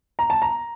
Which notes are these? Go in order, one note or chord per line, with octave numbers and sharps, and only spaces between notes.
A#5
A5
A#5